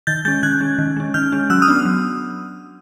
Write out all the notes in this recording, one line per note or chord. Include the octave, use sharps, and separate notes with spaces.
D#3 G6 A6
G#3 C#4 G6 A6
D#3 F#6 G#6
G#3 C#4
D#3
G#3 C#4
D#3 F6 G6
G#3 C#4
F#3 E6 F#6
D#6 F6
B3 D4
F#3